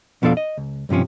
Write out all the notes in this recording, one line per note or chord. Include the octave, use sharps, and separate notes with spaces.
F2 B2 F3 D4 A4 F5
D#5
C#2
B1 G2 C3 F3 C#4